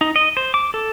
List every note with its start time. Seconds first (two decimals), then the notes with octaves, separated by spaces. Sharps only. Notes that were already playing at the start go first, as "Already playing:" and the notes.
0.01 D#4
0.16 D#5
0.37 C5
0.54 D6
0.74 A4